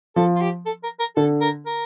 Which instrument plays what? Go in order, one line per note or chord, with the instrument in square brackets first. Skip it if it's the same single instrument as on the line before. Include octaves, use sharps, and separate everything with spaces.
[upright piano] F3 [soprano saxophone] A4
[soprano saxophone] F4
G4
A4
A#4
A#4
[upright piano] D3 [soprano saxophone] A4
[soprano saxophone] A#4
A#4